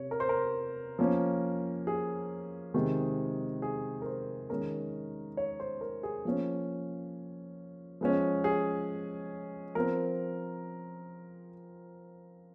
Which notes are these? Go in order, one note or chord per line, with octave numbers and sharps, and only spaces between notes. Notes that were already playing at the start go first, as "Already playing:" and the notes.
Already playing: C3 C#5
A#4
C5
A#4
F3 A#3 C#4
G#4
C3 D#3 G#3 C4
G#4
A#4
C5
D#3 G#3 C#4 A#4
C#5
C5
A#4
G#4
F3 A#3 C#4
F3 G#3 C#4
G#4
F3 C4 A#4